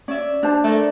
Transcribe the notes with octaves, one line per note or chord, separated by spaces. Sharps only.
C#4 D5 E5
D4 C5 A5
A3 A4 A#4 D5